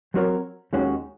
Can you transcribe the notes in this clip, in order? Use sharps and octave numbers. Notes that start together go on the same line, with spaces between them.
F#3 C4 F#4 A#4 C#5
D#2 D#3 G#3 C#4 F#4